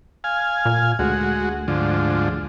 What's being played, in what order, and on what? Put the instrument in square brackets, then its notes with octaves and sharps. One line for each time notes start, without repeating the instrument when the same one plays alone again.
[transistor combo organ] F5 G#5
[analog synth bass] A#2
[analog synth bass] D2 [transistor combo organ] G#3 F#4
[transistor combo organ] G#2 D3 F3